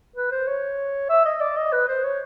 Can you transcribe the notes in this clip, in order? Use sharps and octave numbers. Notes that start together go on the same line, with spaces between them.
B4
C5
C#5
E5
D#5
D5
D#5
B4
C5
C#5